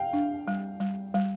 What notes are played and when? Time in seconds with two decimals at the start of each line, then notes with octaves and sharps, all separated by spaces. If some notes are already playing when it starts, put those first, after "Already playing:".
Already playing: F5 G5
0.13 D4
0.48 G3
0.80 G3
1.14 G3